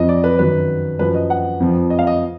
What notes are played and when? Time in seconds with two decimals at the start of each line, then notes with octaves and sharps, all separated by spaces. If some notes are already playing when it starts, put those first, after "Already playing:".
Already playing: F2 F3 D#5
0.09 D5
0.24 B4
0.39 F#2 D#3 F#3 B4
0.99 F#2 F3 B4
1.15 D#5
1.30 F#5
1.60 F2 F3
1.90 D#5
1.99 F5
2.07 D#5